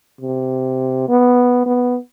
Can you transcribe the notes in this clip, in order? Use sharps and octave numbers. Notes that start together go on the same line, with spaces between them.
C3
B3
B3